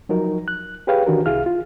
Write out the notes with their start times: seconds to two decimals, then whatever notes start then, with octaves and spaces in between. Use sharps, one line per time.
0.09 F3 F#3 D#4 A#4
0.48 F#6
0.87 G4 G#4 B4 C#5 F5 G5
1.06 D#3 E3 D4 F#4 G4 A#4
1.26 C2 E4 G#4 F5 F6
1.46 F4